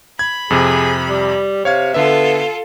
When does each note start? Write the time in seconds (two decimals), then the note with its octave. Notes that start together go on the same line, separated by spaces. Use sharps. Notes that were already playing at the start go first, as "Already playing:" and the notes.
0.19 B5 G#6
0.50 F2 C3 G#4
1.08 G3
1.65 C3 C#5 F5 G#6
1.94 D3 B3 F4 A4 E5